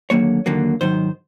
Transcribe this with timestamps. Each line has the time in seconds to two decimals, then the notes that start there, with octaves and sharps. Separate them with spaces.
0.10 D#2 D3 F#3 A#3 C#5
0.46 D#2 D3 F#3 A#3
0.81 G#2 D#3 F#3 C5